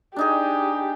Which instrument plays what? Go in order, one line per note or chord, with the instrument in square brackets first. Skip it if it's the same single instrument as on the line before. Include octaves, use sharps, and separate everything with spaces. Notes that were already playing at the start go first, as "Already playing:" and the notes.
[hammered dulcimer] D4 D#4 G#4 [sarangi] G4